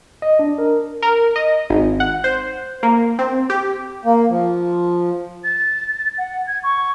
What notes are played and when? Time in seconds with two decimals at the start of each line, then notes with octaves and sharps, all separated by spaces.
0.22 D#5
0.39 D4
0.58 A#4
1.02 A#4
1.36 D#5
1.70 G#1
2.00 F#5
2.24 C5
2.83 A#3
3.19 C4
3.50 G4
4.05 A#3
4.30 F3
5.44 A6
6.18 F#5
6.47 G#6
6.64 C#6